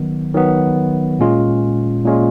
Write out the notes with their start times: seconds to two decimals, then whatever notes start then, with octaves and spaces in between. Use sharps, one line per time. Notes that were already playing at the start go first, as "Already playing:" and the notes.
Already playing: D#3 F#3 B3
0.34 D#3 F#3 B3
1.19 A#2 G#3 C#4 F4
2.05 A#2 G#3 C#4 F4